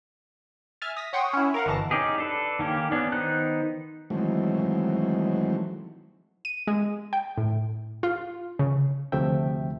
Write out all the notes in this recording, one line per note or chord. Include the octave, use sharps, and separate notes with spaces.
E5 G#5 F6 A6
D#6 A#6 B6
C#5 F#5 G5 C6 C#6 D#6
C#4 E4
A#4 F5 F#5
G1 B2 E3 A5 A#6
C#4 D#4 G4 G#4
D4 A4 B4
D#3 A#3 C#4 G4
B3 C#4 D4
D#3 B3 D#4 C5 F#6
D#3 E3 F#3 G#3 A3 C4
D#7
G#3
G5
A2
F4
C#3
D2 C3 F3 A3 E5 G5